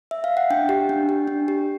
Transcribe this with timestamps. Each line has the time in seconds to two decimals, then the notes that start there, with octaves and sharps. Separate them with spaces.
0.11 E5
0.24 F5
0.37 F#5
0.50 D4 G5
0.69 G4
0.89 D4
1.09 G4
1.28 D4
1.48 G4